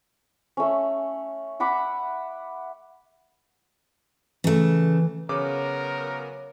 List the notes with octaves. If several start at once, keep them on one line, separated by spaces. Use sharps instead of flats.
A3 C#4
E5 F#5 B5 D6
C#3 E3 A3
C#3 F#3 B3 F#4 A#4 C5 C#5 D6